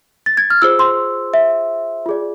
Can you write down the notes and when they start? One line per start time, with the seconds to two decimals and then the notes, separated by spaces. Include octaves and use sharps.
0.26 A6
0.37 G#6
0.50 F6
0.62 F4 G#4 C5 E6
0.79 C6
1.34 E5
2.06 F4 G#4 D5